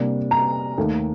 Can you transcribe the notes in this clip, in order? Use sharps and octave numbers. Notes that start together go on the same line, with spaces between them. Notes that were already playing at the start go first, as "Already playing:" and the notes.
Already playing: C3 G3 A#3 D4
A#5
D#2 D#3 A3